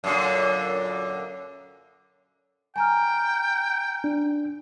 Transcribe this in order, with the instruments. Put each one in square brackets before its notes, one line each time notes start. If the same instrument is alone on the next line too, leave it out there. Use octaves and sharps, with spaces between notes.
[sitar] F#2 A#2 D3
[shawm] G5 [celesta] G#5 A#5 F6
[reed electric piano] D4